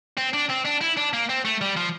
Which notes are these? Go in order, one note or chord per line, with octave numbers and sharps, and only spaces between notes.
C4
D4
C4
D4
E4
D4
A#3
C4
A3
G3
F3